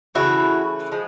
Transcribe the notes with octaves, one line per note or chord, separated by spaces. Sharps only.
C#3 E3 A3 E4 F#4
F3 G#3